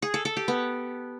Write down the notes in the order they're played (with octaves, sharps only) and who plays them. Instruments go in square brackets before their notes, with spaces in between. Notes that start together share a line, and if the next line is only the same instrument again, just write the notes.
[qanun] G#4
A4
A4
G4
B3